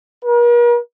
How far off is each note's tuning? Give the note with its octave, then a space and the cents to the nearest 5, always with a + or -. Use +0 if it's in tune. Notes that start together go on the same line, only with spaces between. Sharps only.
A#4 +45